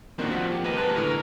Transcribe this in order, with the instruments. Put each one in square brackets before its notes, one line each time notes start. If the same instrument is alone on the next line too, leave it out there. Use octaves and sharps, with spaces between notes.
[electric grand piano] D#3 A#3 D4 [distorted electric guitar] C4 F#4
[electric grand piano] F3 F#5 B6
[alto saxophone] G4
[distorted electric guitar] A#3 D#5 [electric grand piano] G4 A#4 A#5 [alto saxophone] B4
[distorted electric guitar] G#3 A#3 [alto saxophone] B4 [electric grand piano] A5 F#6
[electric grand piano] A2 D3 E3 [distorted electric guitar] A#4 A#5